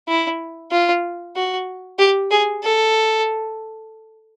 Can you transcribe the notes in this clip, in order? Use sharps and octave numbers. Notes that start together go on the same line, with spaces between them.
E4
F4
F#4
G4
G#4
A4